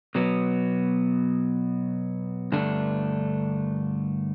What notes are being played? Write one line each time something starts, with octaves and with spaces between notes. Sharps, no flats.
B2 F#3 B3
G2 D3 A3 D4